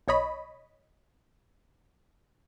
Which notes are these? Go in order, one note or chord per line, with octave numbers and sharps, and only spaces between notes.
B1 C#5 D#5 B5